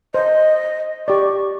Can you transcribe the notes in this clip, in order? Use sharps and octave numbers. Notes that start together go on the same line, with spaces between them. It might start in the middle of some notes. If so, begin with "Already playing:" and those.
C5 D#5
G4 D5 C#6